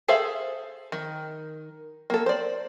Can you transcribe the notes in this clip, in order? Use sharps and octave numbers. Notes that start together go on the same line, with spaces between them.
G#4 A4 C5 E5 F5
D#3
A#3 A4
C5 D5